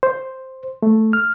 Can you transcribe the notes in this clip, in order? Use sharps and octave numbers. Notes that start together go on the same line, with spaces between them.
C5
A3
F6